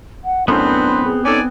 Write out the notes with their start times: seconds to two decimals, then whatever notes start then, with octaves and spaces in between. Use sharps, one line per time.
0.24 F#5
0.48 F#2 A2 B3 C4 D4 B4 C5
1.05 G#4
1.25 C#4 D#4 A4 D5 G#5